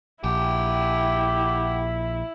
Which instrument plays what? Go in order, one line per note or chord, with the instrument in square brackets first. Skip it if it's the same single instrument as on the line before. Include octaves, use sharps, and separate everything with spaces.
[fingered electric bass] A#1 [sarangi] E4 [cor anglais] G4 [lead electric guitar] F#5 G5